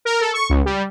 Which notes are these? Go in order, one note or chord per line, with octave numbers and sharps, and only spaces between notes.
A#4
A4
C#6
C#2
G3